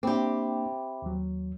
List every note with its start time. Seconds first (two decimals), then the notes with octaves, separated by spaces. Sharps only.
0.03 A#3 C4 D4 G4 E5 B5 D6
1.02 D#2 F#3